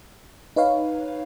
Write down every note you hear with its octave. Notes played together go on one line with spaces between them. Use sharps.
D#4 B4 C#5 F5